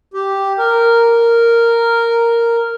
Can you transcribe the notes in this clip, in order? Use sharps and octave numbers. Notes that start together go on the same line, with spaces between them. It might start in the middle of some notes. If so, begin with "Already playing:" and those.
G4
A#4